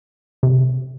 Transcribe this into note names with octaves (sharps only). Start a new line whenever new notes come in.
C3